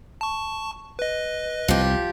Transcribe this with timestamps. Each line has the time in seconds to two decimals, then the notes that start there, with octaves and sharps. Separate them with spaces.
0.21 A5 C#6
0.99 B4 D#5
1.68 C2 F3 G4